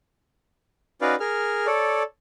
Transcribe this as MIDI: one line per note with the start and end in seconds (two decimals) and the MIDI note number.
1.01 1.15 61
1.01 1.15 63
1.01 1.15 66
1.01 1.15 71
1.01 1.15 74
1.01 1.15 77
1.20 1.66 68
1.20 1.66 70
1.20 1.66 89
1.67 2.03 69
1.67 2.03 73
1.67 2.03 74